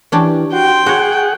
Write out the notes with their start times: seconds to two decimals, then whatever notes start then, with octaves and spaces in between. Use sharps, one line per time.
0.12 E3 C#4 D4 G4
0.53 F#4 G5 C6
0.86 F#4 G#4 C#5 F#5